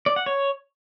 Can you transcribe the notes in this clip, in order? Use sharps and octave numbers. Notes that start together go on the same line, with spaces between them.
D5
F#5
C#5